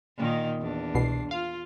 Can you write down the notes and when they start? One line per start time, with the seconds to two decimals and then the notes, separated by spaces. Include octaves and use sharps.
0.17 A#2 D#3 D#4
0.59 E2 D4
0.95 C2 B2 C7
1.31 F4 F5